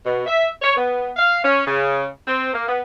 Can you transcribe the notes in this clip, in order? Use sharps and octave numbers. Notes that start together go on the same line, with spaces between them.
B2
E5
C#5
B3
F5
C#4
C#3
C4
A#3
B3